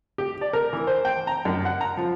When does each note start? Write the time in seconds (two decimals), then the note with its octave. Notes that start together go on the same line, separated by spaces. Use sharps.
0.18 G4
0.41 D5
0.53 A#4
0.73 E3
0.87 C5
1.05 G5
1.27 A#5
1.45 F#2
1.65 F#5
1.81 A#5
1.97 F3